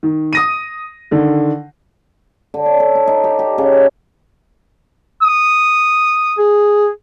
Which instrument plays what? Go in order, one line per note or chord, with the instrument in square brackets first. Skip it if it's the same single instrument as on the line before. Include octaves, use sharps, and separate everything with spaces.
[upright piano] D#3
D#6 A#6 D#7
D3 D#3
[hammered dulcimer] D3
C#5
A4
D#4
D#4
G4
G4
C#3
E5
[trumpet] D#6
[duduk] G#4